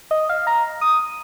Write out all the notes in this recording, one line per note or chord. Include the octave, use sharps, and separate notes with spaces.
D#5
F5
A#5
D#6